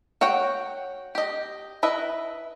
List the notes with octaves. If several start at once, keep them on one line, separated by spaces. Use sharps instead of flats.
F#4 C#5 F#5 G5
G4 D#5
E4 B4 D#5 E5